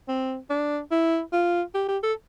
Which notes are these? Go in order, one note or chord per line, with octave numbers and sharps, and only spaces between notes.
C4
D4
E4
F4
G4
G4
A4